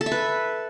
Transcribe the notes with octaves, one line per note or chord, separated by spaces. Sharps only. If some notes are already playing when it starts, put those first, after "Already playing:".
A4
E5
B4